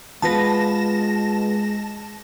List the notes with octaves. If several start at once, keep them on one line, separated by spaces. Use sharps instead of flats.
G#3 B3 F4 B4 A5 A#6